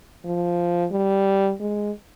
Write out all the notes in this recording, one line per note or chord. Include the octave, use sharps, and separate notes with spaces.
F3
G3
G#3